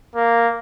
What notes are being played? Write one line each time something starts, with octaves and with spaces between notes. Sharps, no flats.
A#3